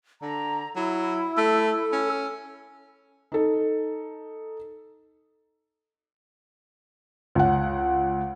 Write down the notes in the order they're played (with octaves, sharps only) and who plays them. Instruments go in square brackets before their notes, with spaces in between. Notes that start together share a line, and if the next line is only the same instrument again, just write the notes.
[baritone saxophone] D3 [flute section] A#5
[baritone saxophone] F#3 [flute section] E4
[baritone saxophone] A3 [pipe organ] A4
[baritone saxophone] C#4
[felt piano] D#4 A4
C#2 F#5